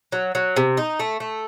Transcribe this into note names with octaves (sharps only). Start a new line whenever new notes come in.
F#3
F#3
C3
D#4
A3
A3